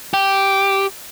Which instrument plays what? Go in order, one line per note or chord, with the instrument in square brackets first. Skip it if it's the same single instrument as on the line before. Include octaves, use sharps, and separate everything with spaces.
[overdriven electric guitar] G4